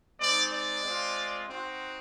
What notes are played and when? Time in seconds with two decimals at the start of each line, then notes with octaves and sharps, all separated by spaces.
0.20 G#3 C4 D#4 D5
0.52 D5
0.84 G#3 C4 F4
1.48 C4 D#4 F#4